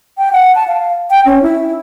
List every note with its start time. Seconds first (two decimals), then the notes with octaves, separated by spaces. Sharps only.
0.18 G5
0.33 F#5
0.55 A5
0.67 F5
1.10 G5
1.26 C#4
1.42 E4